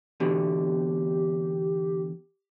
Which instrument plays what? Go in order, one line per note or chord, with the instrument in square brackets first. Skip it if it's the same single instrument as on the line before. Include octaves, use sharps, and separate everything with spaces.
[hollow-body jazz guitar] E2 B2 D3 [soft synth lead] G4